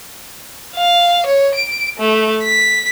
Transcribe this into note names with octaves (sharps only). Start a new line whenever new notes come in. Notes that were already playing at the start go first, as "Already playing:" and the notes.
F5
C#5
D7
A3
B6